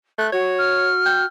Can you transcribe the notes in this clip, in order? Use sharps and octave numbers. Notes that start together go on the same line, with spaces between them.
A3 F#6
F#4 C#5
F6
G5